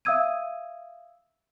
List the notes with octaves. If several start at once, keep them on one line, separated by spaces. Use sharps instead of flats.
E5 F5 D#6 E6 G#6 D#7